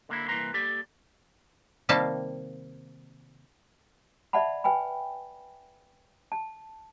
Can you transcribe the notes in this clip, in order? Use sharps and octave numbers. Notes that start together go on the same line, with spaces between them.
D3 A#3 E4
C2 E3 A#3 B4 A#5 C6
A#3 G4 A4 D5
C3 D#3 G3 A#3 F5 A5
D5 E5 F#5 A5 B5
B4 G5 G#5 B5
A5